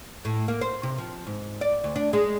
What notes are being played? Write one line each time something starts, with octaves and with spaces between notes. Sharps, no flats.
A2
A#3
C5
C3
F3
G#2
D5
D2
D4
G#3